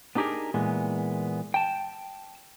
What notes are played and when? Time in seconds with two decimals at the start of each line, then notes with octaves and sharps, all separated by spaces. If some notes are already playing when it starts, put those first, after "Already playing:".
0.15 B3 D4 D#4 G4 G#4 A#4
0.54 A#2 E3 G#3 B3
1.54 G5 A5